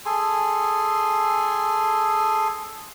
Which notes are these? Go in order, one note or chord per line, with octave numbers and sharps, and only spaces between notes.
G#4 A4 G#5 C6